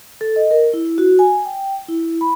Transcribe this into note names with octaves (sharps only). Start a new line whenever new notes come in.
A4
D#5
A#4
E4
F#4
G#5
G5
E4
B5